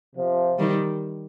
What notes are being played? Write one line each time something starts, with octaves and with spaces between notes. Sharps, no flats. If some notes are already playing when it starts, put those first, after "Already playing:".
C3 F3
D#3 G3